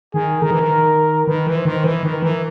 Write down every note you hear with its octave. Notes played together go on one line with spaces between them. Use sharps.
D#3 G#4
D#3 A#4
E3
D#3
D#3 B4
E3
C5
D#3
E3 B4
D#3
A#4
E3